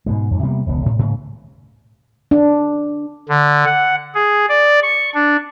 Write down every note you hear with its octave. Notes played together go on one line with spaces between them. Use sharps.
G#2 B2 G#3
F2 G#2
C3 G3 A#3 B3
E1 C#2 B3
A2
G#2 C#3 A#3
D4
D3
F#5
G#4
D5
C#6
D4